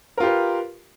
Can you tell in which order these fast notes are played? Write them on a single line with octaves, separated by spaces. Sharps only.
A#4 F4 G4 B4